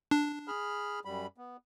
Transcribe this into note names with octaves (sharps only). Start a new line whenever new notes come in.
D4
G#4 B5 F6
F#2 G3 B5
B3